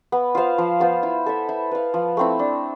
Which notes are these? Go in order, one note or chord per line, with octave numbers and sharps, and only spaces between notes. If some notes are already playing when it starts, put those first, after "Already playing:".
B3
F4 C5 F5
F3
B3 F4 C5
E4
A4 E5
E4
B4 F5
F3
A3 C4 E4
D4